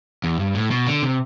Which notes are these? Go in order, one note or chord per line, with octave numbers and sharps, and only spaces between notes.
E2
G2
A2
B2
D3
C3